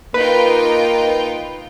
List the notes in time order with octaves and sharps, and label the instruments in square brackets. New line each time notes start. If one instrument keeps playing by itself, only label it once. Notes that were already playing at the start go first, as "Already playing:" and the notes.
[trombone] A#3 [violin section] D#4 F4 G5 [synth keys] B4